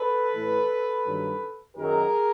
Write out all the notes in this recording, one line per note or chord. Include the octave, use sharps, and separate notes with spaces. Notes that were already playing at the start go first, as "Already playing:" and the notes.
Already playing: A4 B4
A2 E3
G2 D#3 F#3
F#2 D#3 F#3 G#4 A#4